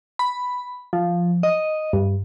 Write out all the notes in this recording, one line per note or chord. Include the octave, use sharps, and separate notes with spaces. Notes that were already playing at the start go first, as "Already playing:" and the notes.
B5
F3
D#5
G2